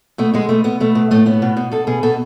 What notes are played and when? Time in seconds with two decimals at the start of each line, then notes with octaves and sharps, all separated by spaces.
0.18 B2 A3
0.34 B2 G#3
0.49 B2 A3
0.64 B2 B3
0.80 B2 A3
0.95 B2
1.11 A2 A3
1.26 A2 B3
1.42 B2
1.57 B2
1.72 B2 A4
1.87 B2 G#4
2.03 B2 A4